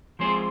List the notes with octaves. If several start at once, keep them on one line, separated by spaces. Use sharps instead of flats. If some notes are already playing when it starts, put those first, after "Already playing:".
F3 G#3 C4 G#4 C5